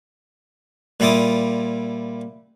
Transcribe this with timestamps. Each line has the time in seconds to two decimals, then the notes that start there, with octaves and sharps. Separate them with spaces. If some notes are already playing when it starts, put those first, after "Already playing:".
1.00 A#2 G3 E4 F4 D6 D#6